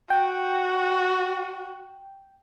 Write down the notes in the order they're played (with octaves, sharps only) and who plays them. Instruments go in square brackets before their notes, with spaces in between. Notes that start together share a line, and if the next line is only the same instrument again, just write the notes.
[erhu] F#4 [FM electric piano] G5